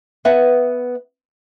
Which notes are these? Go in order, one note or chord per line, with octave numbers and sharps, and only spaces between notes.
B3 B4 E5 F#5